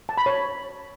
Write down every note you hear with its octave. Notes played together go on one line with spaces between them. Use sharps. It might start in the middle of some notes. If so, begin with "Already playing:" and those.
A5
B5
C#5